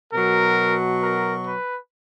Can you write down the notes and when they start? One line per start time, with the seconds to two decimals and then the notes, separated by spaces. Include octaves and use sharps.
0.13 B2 F#3 A#4
1.02 A#4
1.46 B4